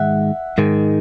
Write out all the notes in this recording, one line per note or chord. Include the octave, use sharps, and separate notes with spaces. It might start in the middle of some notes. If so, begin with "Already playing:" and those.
Already playing: G#2 D#3 G#3 E5 F#5
G#2 D#3 G#3